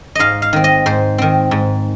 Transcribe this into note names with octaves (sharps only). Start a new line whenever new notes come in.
G#2 D#5 F5
F5
D#3 C4
D#5
G#2 C5
D#3 C4
G#2